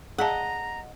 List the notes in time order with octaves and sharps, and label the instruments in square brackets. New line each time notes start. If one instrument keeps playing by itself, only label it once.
[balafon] G#4 F5 A5 [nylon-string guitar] D#5 F#5 [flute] A#5